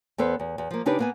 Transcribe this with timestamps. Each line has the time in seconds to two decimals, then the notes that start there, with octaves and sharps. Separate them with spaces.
0.18 E2 B3 A4 C5
0.40 E2
0.58 E2
0.71 F3 A#3
0.86 C#3 D4 D#4 G4 B4
0.99 A#3 B3 G#5